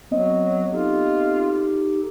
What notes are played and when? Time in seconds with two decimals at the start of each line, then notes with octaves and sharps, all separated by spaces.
0.11 F#3 B3 C4 D#5
0.71 D#4 F4 G4 A4